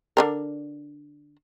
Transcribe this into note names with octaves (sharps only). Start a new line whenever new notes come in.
D3 D4 A#4